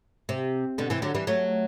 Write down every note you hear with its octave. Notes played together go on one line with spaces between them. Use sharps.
C3
B2 D3
C3 E3
D3 F#3
E3 G3
F#3 A3